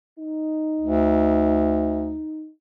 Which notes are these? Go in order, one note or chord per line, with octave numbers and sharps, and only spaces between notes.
D#4
D2